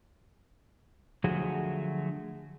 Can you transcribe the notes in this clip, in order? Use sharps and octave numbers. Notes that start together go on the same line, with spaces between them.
D3 F3 F#3 A3 F#4 G#4